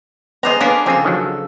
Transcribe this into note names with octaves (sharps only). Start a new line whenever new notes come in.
B3 G#4 C5 D5 D#5 A#5
A#3 B3 C#4 D4 G#4
F2 C#3 C4 G#4 A4
D#3 F3 F#3